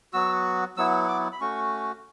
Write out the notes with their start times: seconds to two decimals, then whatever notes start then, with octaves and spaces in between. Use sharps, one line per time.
0.13 F#3 B3 F#4 E6
0.77 F#3 B3 E4 E6
1.08 D6
1.32 B5
1.41 A3 C#4 F#4 C#6